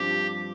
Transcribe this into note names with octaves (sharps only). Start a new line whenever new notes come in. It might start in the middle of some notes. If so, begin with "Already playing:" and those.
Already playing: G2 F3 C4 F4 G4